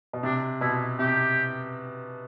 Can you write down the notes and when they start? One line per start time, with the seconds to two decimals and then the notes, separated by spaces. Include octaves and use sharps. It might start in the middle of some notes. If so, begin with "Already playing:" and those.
0.13 B2
0.23 C3 D4
0.61 B2 E4
0.99 C3 G4